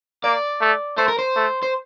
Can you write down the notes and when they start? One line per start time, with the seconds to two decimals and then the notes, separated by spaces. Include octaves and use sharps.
0.24 A#3 D5
0.61 A3
0.97 A3 C5
1.08 A#4
1.19 C5
1.36 A3
1.63 C5